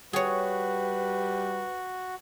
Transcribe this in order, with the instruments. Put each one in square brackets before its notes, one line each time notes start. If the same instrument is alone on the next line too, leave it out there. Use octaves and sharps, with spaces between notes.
[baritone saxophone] G3 [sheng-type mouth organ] F#4 [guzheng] G#4 C#5 [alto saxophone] B4